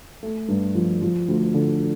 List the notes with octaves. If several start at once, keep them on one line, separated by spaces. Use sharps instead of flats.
A3
G2
F3
F3
D2
D3